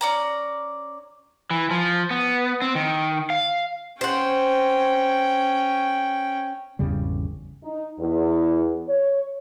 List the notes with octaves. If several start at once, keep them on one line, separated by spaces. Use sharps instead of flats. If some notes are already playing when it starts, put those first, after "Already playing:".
C#4 D5 A#5
E3
F3
B3
C4
D#3
F5
C#4 C5 F#5 G5
G#1 E2 C#3 G3
D#4
E2
C#5